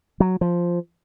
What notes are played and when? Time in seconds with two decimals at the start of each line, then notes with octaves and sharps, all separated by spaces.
0.20 F#3
0.41 F3